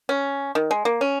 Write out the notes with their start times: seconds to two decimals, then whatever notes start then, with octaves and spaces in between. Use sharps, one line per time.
0.09 C#4
0.55 D#3
0.71 G#3
0.85 A#3
1.01 C#4